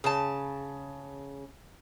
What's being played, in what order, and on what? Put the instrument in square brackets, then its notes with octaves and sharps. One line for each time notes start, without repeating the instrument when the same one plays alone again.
[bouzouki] C#3 A5